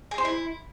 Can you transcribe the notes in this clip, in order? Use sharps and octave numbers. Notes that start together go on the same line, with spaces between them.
G#4
C5
E4